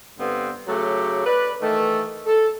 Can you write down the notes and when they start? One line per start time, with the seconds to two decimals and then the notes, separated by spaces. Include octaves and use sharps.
0.19 G2 D3 B3 C4
0.67 C#3 F#3 A3 G4
1.26 B4 D5
1.61 D#3 E3 A3
2.26 A4